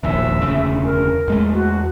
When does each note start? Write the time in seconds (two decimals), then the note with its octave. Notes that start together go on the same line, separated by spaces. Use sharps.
0.03 E1 A#1 D#2 E5
0.41 E1 D2 C#3
0.84 A#4
1.28 E2 G#3 A3
1.54 F#4